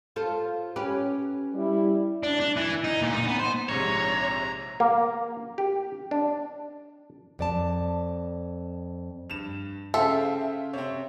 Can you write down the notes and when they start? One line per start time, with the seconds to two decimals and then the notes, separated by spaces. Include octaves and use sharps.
0.16 F4 A4 C5
0.76 C#4 G4 B4
1.55 G3 E4
2.23 D4
2.40 D4
2.57 E3
2.84 D#4
3.01 A#2
3.13 D#4
3.27 B3
3.39 C5
3.69 A#1 G#2 C3 C#5 A#5
4.80 A#3
5.58 G4
6.11 D4
7.39 F2 D5 A5
9.30 G2 E7 F7
9.94 C#3 A4 C5 E5 F5 G5
10.73 C3 C4 C#5